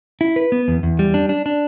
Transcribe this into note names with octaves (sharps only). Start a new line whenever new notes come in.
E4
B4
B3
E2
E2
G3
D4
D4
D4